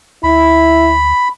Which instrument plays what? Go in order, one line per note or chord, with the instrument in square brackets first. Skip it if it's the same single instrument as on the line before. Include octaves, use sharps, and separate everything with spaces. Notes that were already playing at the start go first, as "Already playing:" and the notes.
[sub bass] D2 [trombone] E4 [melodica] B5